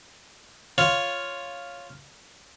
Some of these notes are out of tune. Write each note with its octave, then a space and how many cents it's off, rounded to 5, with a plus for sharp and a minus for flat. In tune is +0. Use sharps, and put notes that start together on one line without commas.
F4 +0 C#5 +0